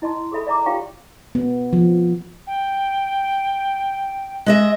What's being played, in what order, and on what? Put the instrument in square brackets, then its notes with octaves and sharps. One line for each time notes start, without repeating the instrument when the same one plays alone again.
[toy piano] E4 D#5 A5 C6
G#4 A4 E5 B5
D5 E5 A#5 D6
F4 G4 C#5 F5 G5 C#6
[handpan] B3
F3
[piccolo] G5
[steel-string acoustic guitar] G#3 D#5 E5